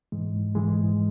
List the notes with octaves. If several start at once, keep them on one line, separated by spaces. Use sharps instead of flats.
G#2 E3 G#3
G#2 E3 G#3